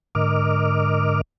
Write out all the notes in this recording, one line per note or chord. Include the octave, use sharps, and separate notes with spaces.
G#2 D3 A#4 D#5 D6 F6